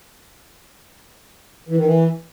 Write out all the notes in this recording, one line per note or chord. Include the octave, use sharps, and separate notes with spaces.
E3
D#3
E3